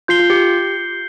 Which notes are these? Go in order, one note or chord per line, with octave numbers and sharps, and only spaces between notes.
F4 G6 C7 G7
F4
G4